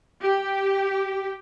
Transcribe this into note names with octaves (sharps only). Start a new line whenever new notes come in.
G4